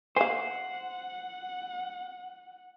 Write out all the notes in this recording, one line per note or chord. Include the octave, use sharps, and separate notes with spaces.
C5 F5 F#5 G#5